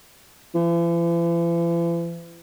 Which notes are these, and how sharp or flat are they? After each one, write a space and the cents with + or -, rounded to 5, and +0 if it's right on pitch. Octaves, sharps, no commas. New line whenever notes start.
E3 +45